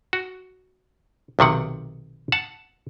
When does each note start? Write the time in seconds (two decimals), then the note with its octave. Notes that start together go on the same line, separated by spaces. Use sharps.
0.13 F#4
1.39 B1 C3 D#3 F#5
2.32 F#5 A5